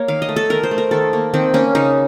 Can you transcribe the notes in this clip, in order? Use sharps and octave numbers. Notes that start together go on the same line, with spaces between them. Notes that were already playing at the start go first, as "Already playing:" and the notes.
Already playing: A#3 A#4 C#5
D#3 F5
D#5
A3
A4
D#3 A#4
C5
A3
A#4
D#3 A4
A#3
D#3 C4
A#3 C#4
C#3 D#4